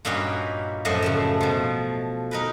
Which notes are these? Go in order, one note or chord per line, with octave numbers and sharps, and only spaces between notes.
G2 A#2 C#4 D#4 F#4 G4
F#2 A2 F3 F#4 D#5
A2 C#3 A3
B2 F3
D#4 A#4 B4